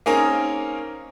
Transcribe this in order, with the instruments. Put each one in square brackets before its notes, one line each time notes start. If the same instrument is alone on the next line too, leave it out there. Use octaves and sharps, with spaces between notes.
[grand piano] A#3 C4 C#4 D#4 G#4 A#4